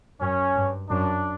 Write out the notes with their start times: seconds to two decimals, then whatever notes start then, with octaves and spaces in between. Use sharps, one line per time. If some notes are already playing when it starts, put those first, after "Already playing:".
0.21 F#2 C#4
0.56 G2
0.90 F#2 D4